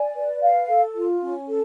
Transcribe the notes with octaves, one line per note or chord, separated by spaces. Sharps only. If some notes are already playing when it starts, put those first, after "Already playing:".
Already playing: D5 G#5
B4
F5
A4
F4
C#4
A4